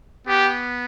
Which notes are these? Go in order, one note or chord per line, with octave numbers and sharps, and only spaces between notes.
B3 G4